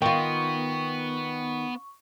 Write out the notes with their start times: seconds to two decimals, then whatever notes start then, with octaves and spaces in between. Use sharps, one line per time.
0.02 D#3 B3 F4 G5 C#6